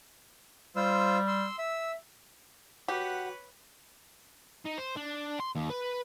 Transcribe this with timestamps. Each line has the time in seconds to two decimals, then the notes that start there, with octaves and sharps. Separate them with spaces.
0.76 G3 F4 C5 E6
1.27 C6 E6
1.59 E5 E6
2.88 F#4 G4 B4 C#5 F#5
4.65 D#4
4.78 C5
4.96 D4
5.40 C6
5.56 D#2
5.70 B4